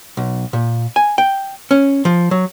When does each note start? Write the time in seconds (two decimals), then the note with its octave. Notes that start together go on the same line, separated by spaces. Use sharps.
0.17 B1
0.53 A#2
0.96 G#5
1.18 G5
1.71 C#4
2.05 F3
2.31 F#3